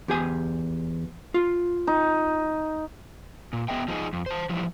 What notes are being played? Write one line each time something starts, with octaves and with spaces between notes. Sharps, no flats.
E2 G4 G#5
F4
D#4
A#2
B3 G#4 D#5 E5 G5
F3 G#3 C4 D4 D#4 G#4
F2
C5 A5
E3 F3 G3